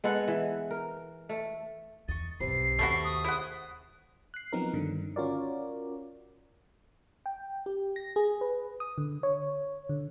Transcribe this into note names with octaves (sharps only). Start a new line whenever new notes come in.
G#3 B3 A4 F#5
E3
A#4
A3
E2 D#5 C#6 A6
B1 G2 C3 B4 C7
D#2 A3 E4 F#4
D#6
E4 G#4 C5 E5 F#5
F#6 C7
F3 F#3 B3 C4 D#4 A#4
G2 D3 D#3
C#4 F4 F#4 A#4 C#5 D5
G5
G4
A#6
G#4
B4
D#6
D3
C#5
D3